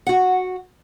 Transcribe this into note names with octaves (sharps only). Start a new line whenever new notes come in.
F#4 F#5